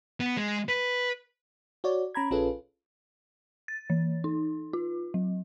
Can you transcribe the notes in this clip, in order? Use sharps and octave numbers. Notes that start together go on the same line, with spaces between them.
B3
G#3
B4
F#4 C#5 D5
C#4 A#5 B5 G#6
A#1 C#4 F4 G#4 A4 B4
A6
E3
D#4
F4
F#3